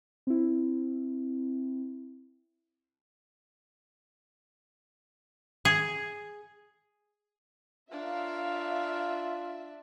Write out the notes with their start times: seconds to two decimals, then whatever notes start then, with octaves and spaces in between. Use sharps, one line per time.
0.27 C4 E4
5.65 G#4
7.92 D4 F4 A#4 C#5 E5 F5